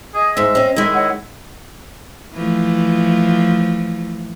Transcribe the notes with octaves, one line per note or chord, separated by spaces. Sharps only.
G#4 D#5
G#2 G#3 E5
C4 C#4
D#3 G#3 E4
C#5 D#5 F#5
E3 F3 A3